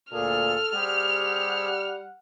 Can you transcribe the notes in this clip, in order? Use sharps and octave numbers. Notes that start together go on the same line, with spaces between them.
D2 A#2 G#4 A4 F6
G3 C4 G4 G#4 F#5